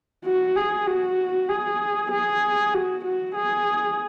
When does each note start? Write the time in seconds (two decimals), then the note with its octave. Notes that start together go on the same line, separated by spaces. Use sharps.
0.25 F#4
0.56 G#4
0.87 F#4
1.50 G#4
2.12 G#4
2.74 F#4
3.04 F#4
3.35 G#4